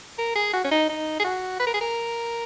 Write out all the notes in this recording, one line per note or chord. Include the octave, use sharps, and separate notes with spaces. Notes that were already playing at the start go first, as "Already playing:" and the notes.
A#4
G#4
F#4
C#4
D#4
D#4
G#4
F#4
B4
A#4
G#4
A#4